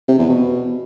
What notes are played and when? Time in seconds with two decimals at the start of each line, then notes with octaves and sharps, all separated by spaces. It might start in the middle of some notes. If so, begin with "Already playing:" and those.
0.08 C3
0.19 E2
0.29 B2